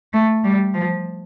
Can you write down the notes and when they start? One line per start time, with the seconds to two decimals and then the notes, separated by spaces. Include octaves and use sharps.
0.13 A3
0.44 G3
0.74 F3